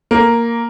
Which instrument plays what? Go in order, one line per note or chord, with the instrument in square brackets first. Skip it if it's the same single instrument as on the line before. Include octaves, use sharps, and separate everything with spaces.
[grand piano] A#3